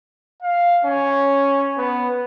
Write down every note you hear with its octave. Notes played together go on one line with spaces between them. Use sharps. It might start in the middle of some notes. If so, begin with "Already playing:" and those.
F5
C#4
B3